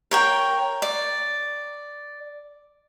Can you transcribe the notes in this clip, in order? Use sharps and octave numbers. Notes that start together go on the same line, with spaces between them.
A#4 C#5 G5
D5